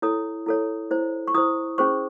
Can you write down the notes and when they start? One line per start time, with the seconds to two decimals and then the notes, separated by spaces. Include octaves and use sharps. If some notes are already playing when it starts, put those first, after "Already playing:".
0.02 E4 A4 C#5 D#6
0.46 E4 A4 C#5
0.91 E4 C5
1.27 C#6
1.35 E4 C5 D#6
1.78 C#4 G#4 C5 C#6